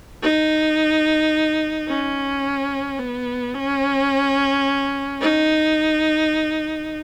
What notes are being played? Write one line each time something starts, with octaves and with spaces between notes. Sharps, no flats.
D#4
C#4
B3
C#4
D#4